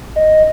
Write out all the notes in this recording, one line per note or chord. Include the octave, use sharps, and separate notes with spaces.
D#5